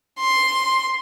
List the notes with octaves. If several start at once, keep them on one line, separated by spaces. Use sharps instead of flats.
C6